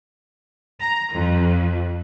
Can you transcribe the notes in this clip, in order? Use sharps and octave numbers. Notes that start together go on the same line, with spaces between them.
A#5
F2